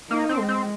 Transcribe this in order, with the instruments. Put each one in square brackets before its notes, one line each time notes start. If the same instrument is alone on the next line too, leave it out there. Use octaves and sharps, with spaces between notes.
[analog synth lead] A#3 [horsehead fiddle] D#4
[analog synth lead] C4
[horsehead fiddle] G#3
[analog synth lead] C4